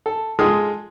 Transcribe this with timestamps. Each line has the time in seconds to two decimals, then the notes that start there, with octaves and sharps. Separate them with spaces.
0.06 A4
0.39 G#3 F4 G#4 A4 D#6 F6